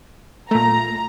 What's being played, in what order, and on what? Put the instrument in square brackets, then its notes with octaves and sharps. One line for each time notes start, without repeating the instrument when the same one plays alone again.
[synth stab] A#2 A3 [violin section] A#5